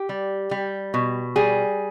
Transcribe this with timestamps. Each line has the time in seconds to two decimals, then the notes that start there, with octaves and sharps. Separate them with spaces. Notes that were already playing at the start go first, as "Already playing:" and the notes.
Already playing: G4
0.09 G3
0.51 G3
0.94 B2
1.36 G3 G#4